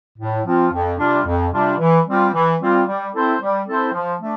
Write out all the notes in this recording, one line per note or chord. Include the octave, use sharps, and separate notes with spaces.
A2
F3 C4 F4
F2
C3 G3 D4 F4
F2
C3 G3 D4 F4
E3
G3 C4 F4
E3
G3 C4 F4
G3
C4 E4 A4 C5
G3
C4 E4 A4 C5
F3
A3 D4